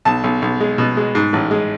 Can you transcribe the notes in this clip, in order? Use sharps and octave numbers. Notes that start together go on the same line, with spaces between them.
B1 A5
B1
B1
G#3
B2
G#3
G#2
A1
G#3